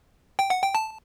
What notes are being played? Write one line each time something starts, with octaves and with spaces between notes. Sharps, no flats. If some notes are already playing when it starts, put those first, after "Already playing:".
G5
F#5
G5
A5